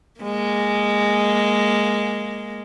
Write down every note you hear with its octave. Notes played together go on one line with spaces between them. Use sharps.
G#3 A#3